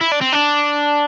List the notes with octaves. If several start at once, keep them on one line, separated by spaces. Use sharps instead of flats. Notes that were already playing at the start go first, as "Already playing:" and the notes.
E4
D4
C4
D4